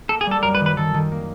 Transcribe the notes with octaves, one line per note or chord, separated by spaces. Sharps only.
A#3 A4
G#4
G3
A4
F#2 A#4
B4
D#3
B4
D#3 A4
D#3
A#3